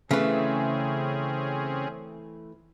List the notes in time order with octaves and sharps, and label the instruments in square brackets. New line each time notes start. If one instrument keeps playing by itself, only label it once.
[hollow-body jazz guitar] C#3 B4 [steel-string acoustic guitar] E3 A3 [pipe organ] C4 C#4 G#4